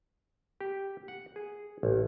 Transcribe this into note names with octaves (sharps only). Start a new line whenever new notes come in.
G4
F#5
G#4
A1